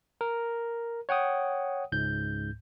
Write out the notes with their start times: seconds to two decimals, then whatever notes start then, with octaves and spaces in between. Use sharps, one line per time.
0.21 A#4
1.09 C#5 F#5 G5 D#6
1.92 C#2 G#2 G6